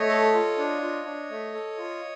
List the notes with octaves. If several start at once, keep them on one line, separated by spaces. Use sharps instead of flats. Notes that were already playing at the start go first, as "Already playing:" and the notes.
Already playing: A3 C#5 D#5
A4
F4
D4
F4
D4
A3
A4
F4